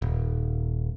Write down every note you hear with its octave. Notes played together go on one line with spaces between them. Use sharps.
D#1